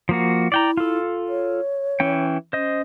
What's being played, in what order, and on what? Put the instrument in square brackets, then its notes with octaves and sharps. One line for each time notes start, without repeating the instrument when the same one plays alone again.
[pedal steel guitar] F3 A#3 F#4
[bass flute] E4 [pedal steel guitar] D5 G5 A#5
[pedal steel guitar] F4 A4
[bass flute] C#5
[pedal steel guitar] E3 C#4 G5
[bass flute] C#4 [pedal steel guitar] C5 D#5